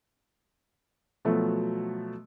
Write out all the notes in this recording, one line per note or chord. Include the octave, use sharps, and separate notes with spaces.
B2 F3 F#3 A3